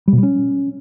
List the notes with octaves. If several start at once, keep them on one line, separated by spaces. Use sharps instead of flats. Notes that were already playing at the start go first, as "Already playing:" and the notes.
G3
B2
G3
C#4